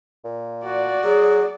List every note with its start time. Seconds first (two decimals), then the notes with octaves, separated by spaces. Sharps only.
0.25 A#2
0.65 F#4 D5
1.04 F#3 G#4